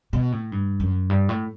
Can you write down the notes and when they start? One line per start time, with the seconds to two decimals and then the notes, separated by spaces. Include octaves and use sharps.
0.13 B2
0.32 A2
0.52 G2
0.80 F#2
1.10 G2
1.29 A2